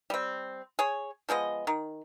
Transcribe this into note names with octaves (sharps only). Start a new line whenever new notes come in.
G3 C4
G#4 C#5
F3 G#3 B3 D#5
D#3